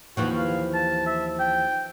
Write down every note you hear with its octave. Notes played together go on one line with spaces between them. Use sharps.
D#2 E3 F3 F#4
F5
A5
E5
G5